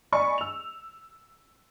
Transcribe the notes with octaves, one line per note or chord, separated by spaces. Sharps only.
D5 D#5 G#5 B5 C#6
E6 F7